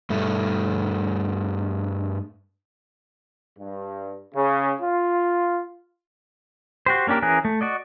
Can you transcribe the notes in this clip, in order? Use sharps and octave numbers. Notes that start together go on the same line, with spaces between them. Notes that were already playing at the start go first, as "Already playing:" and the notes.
G2 A3
G2
C#3
F4
F#4 G4 C5
A#3 C#4 D4 G4 A#4
E3 C#4 G#4 A#4 F#6
A3
F#4 D5 D#5